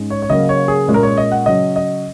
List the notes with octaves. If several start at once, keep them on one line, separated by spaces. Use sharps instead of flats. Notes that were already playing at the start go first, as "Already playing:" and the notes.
Already playing: G#2 G#3 C#4
C#5
C#5
C#3 F#3 A#3 D#5
C#5
G#4
A#2 G#3 C#4
A#4
C#5
D#5
F#5
C#3 F#3 C#4 D#5
D#5